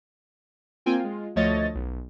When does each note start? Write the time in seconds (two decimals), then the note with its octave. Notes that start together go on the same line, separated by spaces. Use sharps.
0.86 A#3 C4 F4 G5 G#5
1.00 G#3 F4
1.36 D2 F3 A3 C#5 D#5 A6
1.75 B1